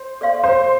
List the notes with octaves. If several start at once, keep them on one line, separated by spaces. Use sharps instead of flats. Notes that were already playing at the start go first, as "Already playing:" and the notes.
Already playing: C5
A4 D5 F5 C6
C5